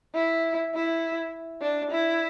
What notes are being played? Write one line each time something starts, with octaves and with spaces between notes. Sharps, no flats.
E4
E4
D4
E4